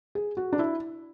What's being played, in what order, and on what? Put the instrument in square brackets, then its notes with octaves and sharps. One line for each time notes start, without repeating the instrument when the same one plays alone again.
[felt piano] G#4
F#4
D4
E4